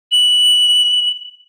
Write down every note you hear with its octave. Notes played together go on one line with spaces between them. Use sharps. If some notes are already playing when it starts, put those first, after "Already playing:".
F#7